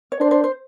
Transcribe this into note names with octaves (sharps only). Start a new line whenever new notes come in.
C#5
D4 C5
C5
C5